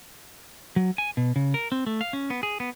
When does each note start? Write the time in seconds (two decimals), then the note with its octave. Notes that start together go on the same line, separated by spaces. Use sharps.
0.76 F#3
0.98 G#5
1.17 B2
1.36 C#3
1.54 A#4
1.72 C4
1.86 A3
2.01 F5
2.13 C#4
2.30 B3
2.43 G#4
2.60 B3